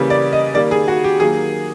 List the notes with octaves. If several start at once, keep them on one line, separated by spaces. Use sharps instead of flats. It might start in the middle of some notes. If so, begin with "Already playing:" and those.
Already playing: C#3 E3 G3 A#3
D5
D#5
D#3 G3 A#3 D5
G#4
F#4
G4
D#3 F#3 A#3 G#4